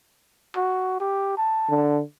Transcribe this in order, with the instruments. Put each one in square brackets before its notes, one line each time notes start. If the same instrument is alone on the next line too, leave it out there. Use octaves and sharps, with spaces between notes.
[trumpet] F#4
G4
A5
[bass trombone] D3